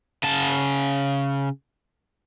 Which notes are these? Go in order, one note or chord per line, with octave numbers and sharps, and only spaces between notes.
C#3 A5